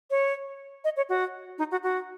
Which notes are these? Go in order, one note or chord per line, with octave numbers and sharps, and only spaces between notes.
C#5
D#5
C#5
F#4
D#4
F#4
F#4